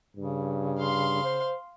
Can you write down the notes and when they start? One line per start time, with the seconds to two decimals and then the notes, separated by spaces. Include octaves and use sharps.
0.16 G2 C#3
0.78 F5 C6
1.24 C5